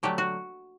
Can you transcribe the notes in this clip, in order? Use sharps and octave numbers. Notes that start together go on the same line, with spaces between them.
D3 F#3 A3 G4
F#4